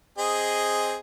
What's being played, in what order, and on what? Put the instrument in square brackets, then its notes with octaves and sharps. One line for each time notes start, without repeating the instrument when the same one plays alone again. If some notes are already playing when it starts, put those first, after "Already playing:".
[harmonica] C4 G#4 D#5